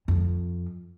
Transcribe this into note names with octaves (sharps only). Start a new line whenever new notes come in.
F2